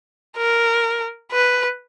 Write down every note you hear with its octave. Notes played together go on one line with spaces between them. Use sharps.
A#4
B4